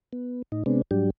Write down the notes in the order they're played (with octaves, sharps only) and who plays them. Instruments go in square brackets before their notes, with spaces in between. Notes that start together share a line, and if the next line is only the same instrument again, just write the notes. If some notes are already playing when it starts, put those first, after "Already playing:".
[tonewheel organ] B3
A2 D#4
C3 G#3 B3 C4 D4
G#2 F#3 G3 D4 G4